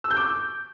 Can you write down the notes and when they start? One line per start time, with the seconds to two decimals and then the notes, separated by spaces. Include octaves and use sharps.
0.04 E6
0.10 G6
0.17 D6